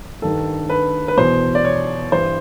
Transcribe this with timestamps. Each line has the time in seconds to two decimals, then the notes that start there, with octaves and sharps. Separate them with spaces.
0.22 G2 D#3 A4
0.70 B4
1.08 B4
1.17 E2 B2 C5
1.55 D5
1.65 C#5
2.11 G2 E3 C5